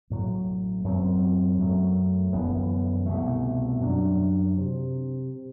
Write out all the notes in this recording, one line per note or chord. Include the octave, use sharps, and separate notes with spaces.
A1 A2 F#3
F#2 F#3 C4
F#2 F#3 A3
G1 F#2 E3 B3
C2 B2 A3
F#2 F#3 B3 D4
C3